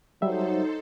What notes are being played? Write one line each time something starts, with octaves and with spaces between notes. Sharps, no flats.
F#3 G3 D#4 A4 C5 E5